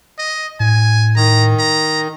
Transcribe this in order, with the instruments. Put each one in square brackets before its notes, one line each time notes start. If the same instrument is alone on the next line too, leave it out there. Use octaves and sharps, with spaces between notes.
[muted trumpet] D#5
[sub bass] A2 [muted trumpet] G#5
[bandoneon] D#3 [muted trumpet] A#5
[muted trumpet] A#5